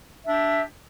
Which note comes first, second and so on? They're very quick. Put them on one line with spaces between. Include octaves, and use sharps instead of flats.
E5 D4 G4